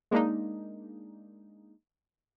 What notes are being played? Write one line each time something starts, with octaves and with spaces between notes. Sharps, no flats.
G#3 A#3 D4 D#4